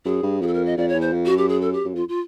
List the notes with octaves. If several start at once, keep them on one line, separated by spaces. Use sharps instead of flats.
F#2 G#4
G2
F2 G#4
A4
A#4
D#5
F2 D5
C#5
E2
C5
F2
F#4
F#2
G4
G#4
A4
G4
F#2
F2 F4
F4